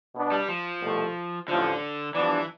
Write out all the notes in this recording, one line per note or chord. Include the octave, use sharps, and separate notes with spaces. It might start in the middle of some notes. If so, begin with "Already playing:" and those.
B2 B3 D4
G3
F3
C2 B2 A3
A1 A2 D3 F3
G2 E3 F3 B3 D4